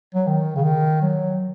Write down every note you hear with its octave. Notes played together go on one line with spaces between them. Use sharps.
F#3
D#3
C#3
D#3
F#3